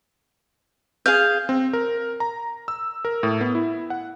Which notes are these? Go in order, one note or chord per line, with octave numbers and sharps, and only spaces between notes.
G#4 F5 G6
C4
A#4
A#5
E6
A#4
A2
B3
E4
F#5